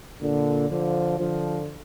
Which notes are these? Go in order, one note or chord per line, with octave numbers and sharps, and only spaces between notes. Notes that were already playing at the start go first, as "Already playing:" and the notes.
A#2 D3
D3 F3
D3 F3